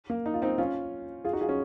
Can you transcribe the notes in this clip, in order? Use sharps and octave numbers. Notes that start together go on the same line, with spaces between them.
A#3
D#4
F4
C4 D#4
C#4 F4
F4 G#4
D#4 F#4
F4 G#4
C#4